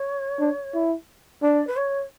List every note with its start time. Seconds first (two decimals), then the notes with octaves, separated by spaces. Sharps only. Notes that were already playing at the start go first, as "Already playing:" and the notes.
Already playing: C#5
0.39 D4
0.74 E4
1.42 D4 D5
1.67 B4
1.76 C#5